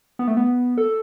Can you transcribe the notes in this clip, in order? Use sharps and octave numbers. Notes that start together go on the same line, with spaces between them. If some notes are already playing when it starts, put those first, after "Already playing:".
B3
A3
B3
A4